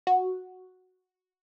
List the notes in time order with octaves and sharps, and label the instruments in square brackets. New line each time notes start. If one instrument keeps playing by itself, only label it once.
[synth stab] F#4